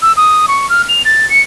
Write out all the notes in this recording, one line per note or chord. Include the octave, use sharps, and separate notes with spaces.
E6
D#6
C#6
F6
F7
A6
C#7